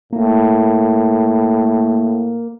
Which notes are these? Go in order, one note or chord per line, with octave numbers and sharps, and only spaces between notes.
A2 A#3